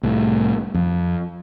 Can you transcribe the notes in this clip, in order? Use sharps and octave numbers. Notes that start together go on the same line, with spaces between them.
C2 A2
F2